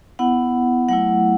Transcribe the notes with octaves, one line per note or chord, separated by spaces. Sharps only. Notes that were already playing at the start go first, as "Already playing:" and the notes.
B3 E4 F#5
F#3 A3 E4 F#5